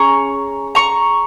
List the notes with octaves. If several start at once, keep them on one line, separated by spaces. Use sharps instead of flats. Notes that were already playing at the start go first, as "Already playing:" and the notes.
Already playing: C#4 G#4 A#5 C#6
A#5 C#6